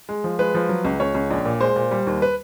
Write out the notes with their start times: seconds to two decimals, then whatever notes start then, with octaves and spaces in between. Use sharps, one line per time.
0.09 G#3
0.24 F3
0.39 G#3 B4
0.55 F3
0.69 F#3
0.84 C#2
1.00 C#2 C#5
1.15 C#2
1.31 A#1
1.46 A#2
1.60 G#3 C5
1.76 A#2
1.91 G3
2.07 D#2
2.22 B4